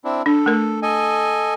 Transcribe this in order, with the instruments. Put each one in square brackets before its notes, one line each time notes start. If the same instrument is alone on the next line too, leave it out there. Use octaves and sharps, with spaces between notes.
[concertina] C4 D4 E4
[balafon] D4 [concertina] A4
[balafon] A3 A#4
[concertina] A4 D#5 G#5